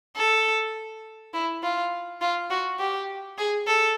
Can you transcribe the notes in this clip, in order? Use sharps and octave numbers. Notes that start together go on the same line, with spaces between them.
A4
E4
F4
F4
F#4
G4
G#4
A4